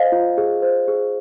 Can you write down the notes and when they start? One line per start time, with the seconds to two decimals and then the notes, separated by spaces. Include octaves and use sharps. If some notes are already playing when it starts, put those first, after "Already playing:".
Already playing: C5 D#5 F5
0.12 F4
0.38 G#4
0.62 C5
0.88 G#4